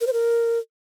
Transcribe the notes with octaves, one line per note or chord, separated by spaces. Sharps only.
A#4
C5
A#4